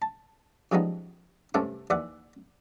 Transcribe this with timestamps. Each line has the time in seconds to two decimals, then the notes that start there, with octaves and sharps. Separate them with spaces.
0.02 A5
0.72 C#3 F3 G3 G#3 B3 D#4
1.54 G2 C3 A3 C#4 A4 D6
1.90 D#2 E3 D5 E5 F#5